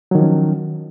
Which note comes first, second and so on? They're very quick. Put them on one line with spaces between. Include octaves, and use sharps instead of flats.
F#3 D#3 F3 C#4